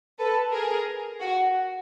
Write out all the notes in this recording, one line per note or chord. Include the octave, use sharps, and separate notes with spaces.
A4 B4
G#4 A#4
F#4